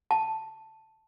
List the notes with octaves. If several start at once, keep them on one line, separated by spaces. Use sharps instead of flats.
A5